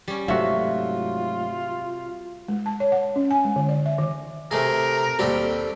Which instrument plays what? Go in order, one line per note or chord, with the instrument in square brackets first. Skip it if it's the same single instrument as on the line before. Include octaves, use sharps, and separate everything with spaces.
[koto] G3 C#4
[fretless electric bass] G#2 F#3 A3 [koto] C3 [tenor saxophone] F4 [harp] F#4 E5
[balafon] G#3
A5
C#5
F#5
C#4
G#5
G#3
D3
D5
E5
D#3
[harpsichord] C3 A3 G#4 [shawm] A#4
[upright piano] D#2 G3 [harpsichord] C4 G4 A4